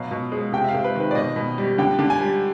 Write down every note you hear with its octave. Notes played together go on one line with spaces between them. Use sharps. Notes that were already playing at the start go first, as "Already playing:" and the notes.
Already playing: B2 F#3 F5
B2
G#3
C3 G5
E5
F5
C3
B4
D#3 B4
D5
B2 D#5
B2
G3
D3 G5
D3
G#5
G3